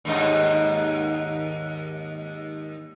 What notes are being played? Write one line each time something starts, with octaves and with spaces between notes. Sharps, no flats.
D#2 G#2 D#4